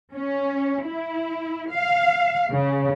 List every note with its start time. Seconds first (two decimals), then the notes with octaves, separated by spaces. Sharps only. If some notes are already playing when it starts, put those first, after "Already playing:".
0.15 C#4
0.85 E4
1.71 F5
2.51 C#3